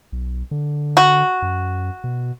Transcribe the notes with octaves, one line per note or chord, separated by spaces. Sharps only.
B1
D3
F#4
F#2
B2